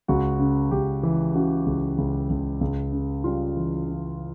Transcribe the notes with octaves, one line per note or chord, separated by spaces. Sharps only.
C#2 F#4
C#3
C#2 G4
E3
C#3 F#4
C#2
C#2
C#2
C#2
C#3
G3 F4
E3
C#3